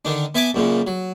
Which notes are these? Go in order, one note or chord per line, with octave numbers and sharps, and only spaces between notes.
D3 D#3 D4
B3 E5 G#5 A5 D6
F#2 A#2 C#3
F#3